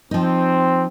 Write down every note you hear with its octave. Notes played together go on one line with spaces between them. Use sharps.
F3 C4 D#4